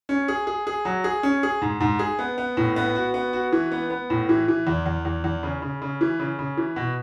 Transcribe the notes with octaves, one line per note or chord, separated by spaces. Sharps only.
C#4
G#4
G#4
G#4
F#3
G#4
C#4
G#4
G#2
G#2
G#4
B3
B3
A2
B3
F#4
B3
F#4
E3
B3
B3
A2
E3
E3
E2
E2
E2
E2
C#3
C#3
C#3
E3
C#3
C#3
E3
B2